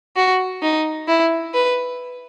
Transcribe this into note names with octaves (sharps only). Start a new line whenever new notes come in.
F#4
D#4
E4
B4